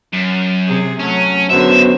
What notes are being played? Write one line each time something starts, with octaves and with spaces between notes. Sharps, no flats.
F#2
C3 G#4
F#3 A3 C#4
F#2 D3 G#3 B3 F#4 C5 E5